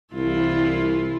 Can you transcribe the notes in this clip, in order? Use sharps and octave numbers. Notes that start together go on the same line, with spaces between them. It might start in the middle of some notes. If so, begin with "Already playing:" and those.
C2 E3 E4 F4